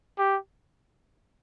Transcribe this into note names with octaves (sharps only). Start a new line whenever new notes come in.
G4